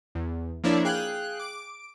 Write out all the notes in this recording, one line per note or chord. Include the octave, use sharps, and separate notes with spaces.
E2
F3 A#3 D4 E4 C#5 D5
G#4 F5 G5 F#6
D6 D7